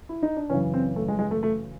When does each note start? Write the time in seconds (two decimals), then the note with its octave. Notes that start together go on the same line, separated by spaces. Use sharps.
0.09 E4
0.23 D#4
0.37 D4
0.50 F#2 C#3 E3 C#4
0.74 C4
0.96 A3
1.08 G#3
1.19 G#3
1.31 A3
1.43 A3